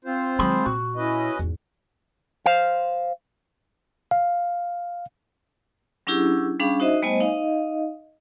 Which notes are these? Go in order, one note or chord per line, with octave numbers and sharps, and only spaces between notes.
C4 F4 C5
D#3 F#3 G#3 G#4 B5
A#2 F#4
C#4 E4 B4 D#5
E2 G#2
C5 F5
F5
F#3 C#4 D4 E4 G4 G#4
G3 C#4 D4 G#4 F5 B5
D#4 F#4 C5 D#5 E5
G3 A3 B3 C5 D#5 G#5
D#4 D#5 F5